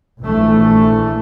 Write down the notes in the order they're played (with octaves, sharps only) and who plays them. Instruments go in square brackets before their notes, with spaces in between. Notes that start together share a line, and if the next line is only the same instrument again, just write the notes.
[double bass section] A#1 E3 A3